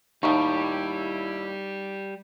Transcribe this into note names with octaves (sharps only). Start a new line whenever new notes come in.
D#2 A2 G3 D#4 E4 A#5 C#6